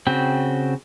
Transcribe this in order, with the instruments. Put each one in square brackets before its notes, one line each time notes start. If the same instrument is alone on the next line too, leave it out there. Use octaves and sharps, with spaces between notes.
[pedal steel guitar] C#3 C4 F#4 G5